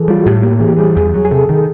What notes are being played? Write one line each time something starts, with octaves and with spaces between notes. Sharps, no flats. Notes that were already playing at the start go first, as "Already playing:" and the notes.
Already playing: E3 G#4 A4
G3 F4
F#4
A2 G4
A#3
E3 G#4
G4
G3 G#4
E2 G#4
F#3
G#4
C3 A4
D#3